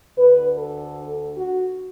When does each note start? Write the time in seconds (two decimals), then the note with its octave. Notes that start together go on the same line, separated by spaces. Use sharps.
0.17 D2 D3 B4
0.57 A4
1.36 F#4